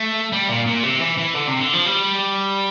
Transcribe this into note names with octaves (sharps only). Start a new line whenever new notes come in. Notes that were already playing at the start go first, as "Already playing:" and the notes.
Already playing: A3
G3
A#2
A#2
C3
E3
E3
D3
C3
D3
F3
G3